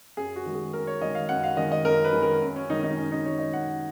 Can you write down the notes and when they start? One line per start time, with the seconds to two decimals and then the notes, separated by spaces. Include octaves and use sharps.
0.17 F#2 G#4
0.36 F#4
0.45 D#3 G#3
0.55 G#4
0.73 F#2 A#4
0.87 C#5
1.01 D#3 G#3 D#5
1.15 F5
1.29 F#2 F#5
1.44 F5
1.57 D#3 G#3 D#5
1.72 D#5
1.85 F#2 A#4
2.05 B4
2.13 D#3 G#3
2.22 A#4
2.41 F#2
2.56 C#4
2.70 D#3 G#3 D#4
2.84 D#4
2.97 F#2 C#4
3.12 D#4
3.26 D#3 G#3 C#5
3.39 D#5
3.53 F#2 F#5